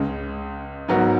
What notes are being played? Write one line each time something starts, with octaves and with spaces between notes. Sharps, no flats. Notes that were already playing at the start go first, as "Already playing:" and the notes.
Already playing: C#2 C#3 G#3
G#2 F#3 B3 F#4 A#4